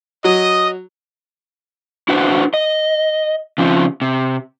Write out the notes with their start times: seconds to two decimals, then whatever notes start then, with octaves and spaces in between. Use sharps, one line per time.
0.24 F#3 D#5 D#6
2.09 D4 E4 F#4 B4 C5
2.54 D#5
3.58 C#3 F3 C4
4.01 C3